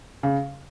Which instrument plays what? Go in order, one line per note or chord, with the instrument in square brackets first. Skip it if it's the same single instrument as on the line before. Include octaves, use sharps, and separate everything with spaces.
[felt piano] C#3